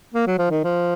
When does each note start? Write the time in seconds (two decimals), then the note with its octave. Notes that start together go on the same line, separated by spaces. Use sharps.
0.14 A#3
0.27 F#3
0.38 F3
0.51 D#3
0.64 F3